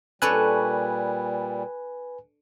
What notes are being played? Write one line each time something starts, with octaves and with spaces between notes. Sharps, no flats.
A#2 G3 D4 A4 B4 C#5 G#5 F#6